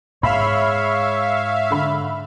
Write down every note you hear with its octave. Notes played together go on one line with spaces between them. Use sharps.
G#2 C#5 E5 F5 B5
D3 B5